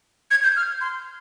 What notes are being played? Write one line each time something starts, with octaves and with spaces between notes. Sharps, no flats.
G#6
G6
F6
C6